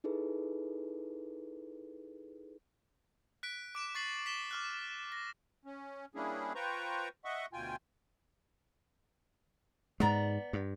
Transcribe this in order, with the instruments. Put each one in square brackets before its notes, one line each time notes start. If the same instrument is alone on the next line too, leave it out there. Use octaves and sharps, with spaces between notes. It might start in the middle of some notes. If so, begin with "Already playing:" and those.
[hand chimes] D#4 E4 G#4 A4 B4
[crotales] F#6 B6 D7
D6 D7 E7
C#6 A6 C7 F#7
B6 E7 G7
D6 F6 F#6
A#6
[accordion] C#4
G3 A#3 C#4 D4 E4 G#4
F4 B4 C5 G5 A#5 C#6
D#5 E5 F#5 C#6
D2 B2 F4 G5 G#5
[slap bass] G#2 G#3 [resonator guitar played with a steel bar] B3 D5 A#5
[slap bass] G2